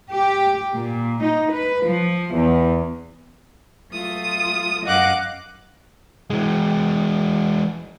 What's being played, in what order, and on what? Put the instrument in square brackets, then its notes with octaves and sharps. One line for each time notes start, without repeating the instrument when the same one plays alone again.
[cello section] G4
A#2
D#4
B4
F3
E2
[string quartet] F#3 A3 F4 D#6
F#2 D#5 F5 F#5 D6 F#6
[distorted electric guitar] E3 G#3